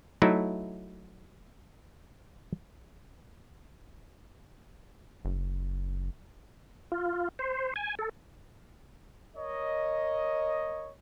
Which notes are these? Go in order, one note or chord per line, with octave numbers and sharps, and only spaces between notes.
F#3 A3 D#4 E4
F#1
F4
C5
G#5
A4
A#4 C#5 D#5